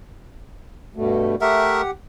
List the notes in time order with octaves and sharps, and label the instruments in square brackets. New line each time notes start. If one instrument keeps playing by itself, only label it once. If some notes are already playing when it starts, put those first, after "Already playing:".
[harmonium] G2 B2 A3
[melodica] A3 A#4 E5 [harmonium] G4 F#5